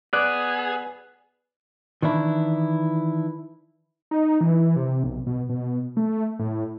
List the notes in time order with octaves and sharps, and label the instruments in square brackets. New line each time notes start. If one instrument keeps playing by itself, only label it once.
[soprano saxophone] B3 [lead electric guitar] G#4 [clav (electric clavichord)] D5 [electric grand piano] F#6
[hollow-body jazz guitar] D#3 E3 D4 E4
[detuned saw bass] D#4
E3
C3
B1
B2
B2
A3
A2